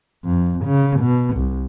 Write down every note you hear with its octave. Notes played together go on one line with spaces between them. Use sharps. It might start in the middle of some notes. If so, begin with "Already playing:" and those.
F2
C#3
B2
C2